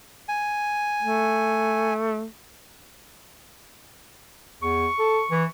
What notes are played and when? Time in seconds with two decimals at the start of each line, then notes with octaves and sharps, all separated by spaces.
0.28 G#5
1.03 A3
4.63 E2 C#6
4.99 A4
5.31 E3